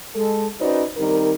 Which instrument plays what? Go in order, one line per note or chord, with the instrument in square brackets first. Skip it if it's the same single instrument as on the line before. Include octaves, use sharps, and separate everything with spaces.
[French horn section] G#3 A4
C#4 D#4 F#4 B4 C5 D5
D#3 G3 C4 D#4 A#4